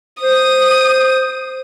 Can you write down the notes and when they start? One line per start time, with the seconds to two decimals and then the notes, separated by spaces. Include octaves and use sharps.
0.22 C5 D#6 D#7